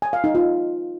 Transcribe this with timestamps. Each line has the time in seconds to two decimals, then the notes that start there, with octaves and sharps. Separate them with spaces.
0.02 G#5
0.13 F5
0.24 D#4
0.35 F4